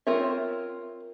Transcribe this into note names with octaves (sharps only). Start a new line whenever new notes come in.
C4 F4 A#4 C#5 E5